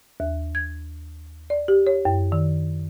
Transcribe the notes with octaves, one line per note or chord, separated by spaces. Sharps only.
D#2
G#6
D5
G4
C#5
F#2
D#3